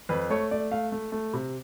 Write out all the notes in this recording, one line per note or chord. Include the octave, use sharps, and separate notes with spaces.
F2 B4
A3 C#5
A3 D5
A3 F5
A3
A3
C3